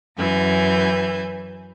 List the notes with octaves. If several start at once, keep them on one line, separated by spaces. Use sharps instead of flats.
F#2 E3 G#5 G6